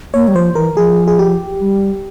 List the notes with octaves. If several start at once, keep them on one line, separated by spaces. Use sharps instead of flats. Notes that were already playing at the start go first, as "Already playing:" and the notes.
A#3 C#5
G3
F3 C5
E3 A#4
F3 G#4
G#4
G4
G3